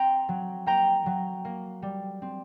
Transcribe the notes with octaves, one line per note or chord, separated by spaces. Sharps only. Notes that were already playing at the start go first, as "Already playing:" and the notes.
Already playing: C4 G5 A#5
F#3
A#3 G5 A#5
F#3
A#3
G3
C4